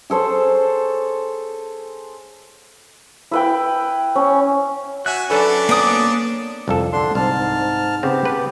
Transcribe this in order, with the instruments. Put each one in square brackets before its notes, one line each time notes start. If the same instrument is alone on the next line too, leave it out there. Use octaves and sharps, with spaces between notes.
[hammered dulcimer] G#4 A4 C5 C#5
[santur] E4 B4 G5
C#4
[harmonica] F#4 E5 [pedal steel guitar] G#5 F#6
[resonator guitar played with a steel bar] F#3 A4 B4 [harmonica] C#4 D4
[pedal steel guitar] A#3 B3 [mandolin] D5 D#6
[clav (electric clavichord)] C2 F2 A4
[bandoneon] D3 D4 C6
[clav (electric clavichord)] C2 [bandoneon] G#2 A5 F6
[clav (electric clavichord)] C#3 C4 [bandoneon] B3 G4
[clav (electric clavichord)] B4